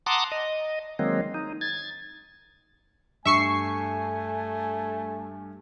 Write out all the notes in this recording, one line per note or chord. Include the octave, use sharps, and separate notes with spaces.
F#5 A5 A#5 C6 D6 D#6
D#5
D#3 F#3 G#3 A#3 C4
D#4
G#6 A6
G2 A3 E5 G#5 C#6 C7